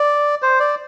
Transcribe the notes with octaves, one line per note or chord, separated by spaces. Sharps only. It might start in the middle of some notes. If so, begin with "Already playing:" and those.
Already playing: D5
C5
D5